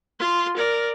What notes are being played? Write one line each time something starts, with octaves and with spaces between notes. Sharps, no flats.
F4 C6
A#4 D5